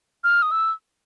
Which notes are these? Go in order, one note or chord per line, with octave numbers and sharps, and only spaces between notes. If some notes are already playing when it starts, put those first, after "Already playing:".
F6
D#6
E6